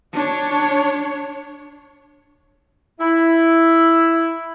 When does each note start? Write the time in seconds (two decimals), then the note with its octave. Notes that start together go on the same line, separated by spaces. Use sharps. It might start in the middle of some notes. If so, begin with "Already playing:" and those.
0.13 D4 C#5
2.99 E4